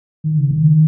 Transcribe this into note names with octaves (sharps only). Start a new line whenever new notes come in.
D#3
C#3
D#3